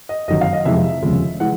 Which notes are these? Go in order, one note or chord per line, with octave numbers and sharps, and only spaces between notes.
D#5
G1 F#2 D#3 F#3 D#5
F5
D#5
F2 C3 E3 G#3 E5
F1 D#2 C#3 F3 G#3
E3 G#3 F#5